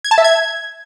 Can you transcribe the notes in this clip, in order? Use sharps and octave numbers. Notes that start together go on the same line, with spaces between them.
G#6
A5
E5
G#6